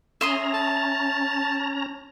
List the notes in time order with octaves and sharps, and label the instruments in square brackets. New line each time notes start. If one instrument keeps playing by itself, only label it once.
[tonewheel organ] C#4 A#5 [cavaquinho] E5 C6 D#6
[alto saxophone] A5